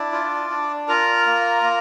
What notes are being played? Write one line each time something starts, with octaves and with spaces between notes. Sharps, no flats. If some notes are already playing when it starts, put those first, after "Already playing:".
Already playing: D4 E4 D5
F4
D4
F4 A#4 A#5
A#3
A#3